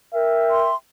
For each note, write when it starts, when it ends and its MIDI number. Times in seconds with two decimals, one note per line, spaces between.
0.14 0.68 70
0.14 0.74 76
0.14 0.74 79
0.50 0.75 84